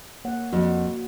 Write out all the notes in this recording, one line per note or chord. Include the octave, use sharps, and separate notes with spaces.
A#3 C#5 F#5
F2 A#3 F#4
F#4